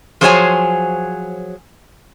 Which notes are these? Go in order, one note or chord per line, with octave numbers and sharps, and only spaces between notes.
F3 F#3 G#4 C5 C#5 G#5